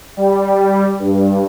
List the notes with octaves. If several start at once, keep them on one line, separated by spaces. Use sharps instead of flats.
G3
G2